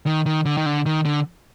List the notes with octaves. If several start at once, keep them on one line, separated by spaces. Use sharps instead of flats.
D#3
D#3
D3
D#3
D3
D#3
D3